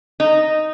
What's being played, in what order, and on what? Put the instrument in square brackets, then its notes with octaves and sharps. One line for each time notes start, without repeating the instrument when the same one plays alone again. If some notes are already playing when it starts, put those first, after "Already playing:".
[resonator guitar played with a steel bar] D#4